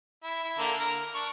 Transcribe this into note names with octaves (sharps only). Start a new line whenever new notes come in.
E4
E4
D3 A#3 A#5
A#4
D4 C#6